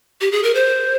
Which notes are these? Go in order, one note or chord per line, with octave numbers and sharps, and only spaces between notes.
G4
G#4
A#4
C5